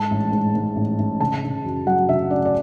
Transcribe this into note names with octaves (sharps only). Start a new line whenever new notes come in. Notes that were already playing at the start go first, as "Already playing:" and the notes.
Already playing: G#2 A5
A1
G#2
G#2
A1
A1
C#3 A5
C#3
F#2
F#3 F#5
C#3 E5
C#4 D5
D5